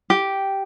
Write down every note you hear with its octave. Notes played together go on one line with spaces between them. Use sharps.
G4